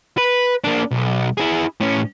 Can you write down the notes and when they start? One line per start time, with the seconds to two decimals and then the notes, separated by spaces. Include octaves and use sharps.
0.18 B4
0.64 A#3 D4
0.91 B1
1.37 E4 G#4
1.80 A2 C#4